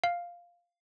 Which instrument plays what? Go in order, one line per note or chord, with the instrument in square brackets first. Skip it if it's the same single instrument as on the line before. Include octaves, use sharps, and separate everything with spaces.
[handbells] F5